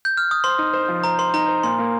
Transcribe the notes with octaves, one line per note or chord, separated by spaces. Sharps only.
G6
F6
D#6
C5 C6
D#4
C5
F3
C5 A#5
C5 C6
D#4 A#5
C5
A#2 C6
A#3